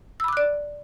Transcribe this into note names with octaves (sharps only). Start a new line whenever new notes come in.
D5 B5 D6 E6 F#6